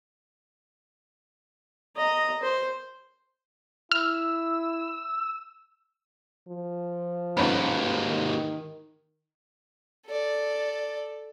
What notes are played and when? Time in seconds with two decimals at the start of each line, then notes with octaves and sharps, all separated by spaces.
1.97 D#5 A#5
2.42 C5
3.92 E4 E6 F6
6.48 F3
7.37 G1 D#2 G#2 C#4 B5
8.08 D#3
10.07 A4 D5